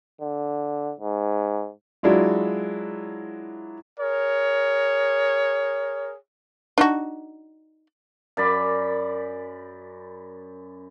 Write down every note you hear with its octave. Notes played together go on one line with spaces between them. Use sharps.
D3
G#2
F#3 G#3 D4 E4 F4
G#4 A#4 C#5
D4 D#4 F#4
F#2 D5 B5